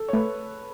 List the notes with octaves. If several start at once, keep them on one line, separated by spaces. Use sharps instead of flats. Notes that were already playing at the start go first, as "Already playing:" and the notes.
Already playing: A4
C#5
A3 B4